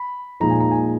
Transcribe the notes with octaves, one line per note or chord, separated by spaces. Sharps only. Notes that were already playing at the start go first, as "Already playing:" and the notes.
Already playing: B5
A#2 F3 G#3 D#4 A#5
G#5
A#5
G#5